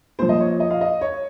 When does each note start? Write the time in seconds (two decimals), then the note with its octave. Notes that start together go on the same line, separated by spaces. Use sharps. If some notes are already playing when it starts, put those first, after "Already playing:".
0.19 A#2 F3 C5
0.29 D#5
0.40 C#5
0.60 D#5
0.71 F5
0.81 D#5
1.01 C#5